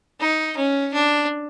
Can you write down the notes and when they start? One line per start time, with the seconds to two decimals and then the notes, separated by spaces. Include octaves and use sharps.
0.20 D#4
0.57 C#4
0.93 D4